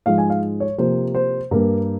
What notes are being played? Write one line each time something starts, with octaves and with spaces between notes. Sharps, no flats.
G#2 F3 G#3 F5
G#5
F5
C#5
C3 F3 A#3 C5
C5
G2 G3 A#3 A#4